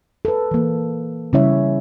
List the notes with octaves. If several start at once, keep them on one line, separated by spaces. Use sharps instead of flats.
A4 B4
E3 A#3
C#3 G3 C#4 E4 C#5 E5